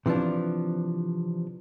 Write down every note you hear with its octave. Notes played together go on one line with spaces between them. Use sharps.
C3 E3 F3 D4